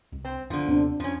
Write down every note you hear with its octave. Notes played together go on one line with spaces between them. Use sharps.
C2
C4
B1 F#2 D3 F3
D#2 C3 B3 C4 D4
F2 F3 C#4